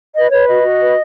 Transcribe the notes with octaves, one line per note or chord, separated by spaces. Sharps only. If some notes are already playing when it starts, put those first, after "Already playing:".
B4 D#5
B4 C#5
F#4 D#5
F#4
B4